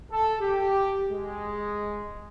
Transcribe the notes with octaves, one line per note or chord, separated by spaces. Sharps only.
A4
G4
G#3